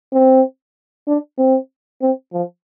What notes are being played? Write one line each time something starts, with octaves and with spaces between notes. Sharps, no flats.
C4
D4
C4
C4
F3